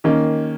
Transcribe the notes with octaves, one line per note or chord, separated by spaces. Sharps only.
D#3 A#3 C#4